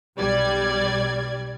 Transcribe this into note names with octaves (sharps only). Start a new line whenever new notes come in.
B1 G3 D5 G#6